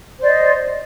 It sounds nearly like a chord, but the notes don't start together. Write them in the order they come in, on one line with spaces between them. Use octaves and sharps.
C5 D5 D#5